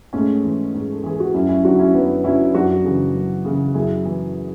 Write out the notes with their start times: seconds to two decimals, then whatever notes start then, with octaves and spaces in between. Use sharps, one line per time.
0.13 G#2 A3 C#4
0.43 E3
0.74 G#2
0.92 A4
1.04 E3 G#4
1.20 F#4
1.34 F#2 C#4 E4
1.49 C#4 E4
1.64 D3 F#3 D4 F#4
1.78 C#4 E4
1.94 F#2 B3 D4
2.24 D3 F#3 C#4 E4
2.54 F#2 D4 F#4
2.84 C#3 E3
3.15 F#2
3.45 C#3 E3
3.74 F#2 E4 G#4
4.05 E3